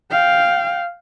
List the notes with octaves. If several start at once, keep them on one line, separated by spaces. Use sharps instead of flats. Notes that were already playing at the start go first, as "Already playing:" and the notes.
F5 G5